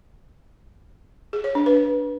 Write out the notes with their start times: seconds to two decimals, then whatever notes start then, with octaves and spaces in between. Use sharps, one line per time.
1.33 G#4
1.44 C#5
1.55 D4
1.66 B4